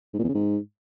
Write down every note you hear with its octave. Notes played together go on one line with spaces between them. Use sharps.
G#2
A#2
E2
C#3
G#2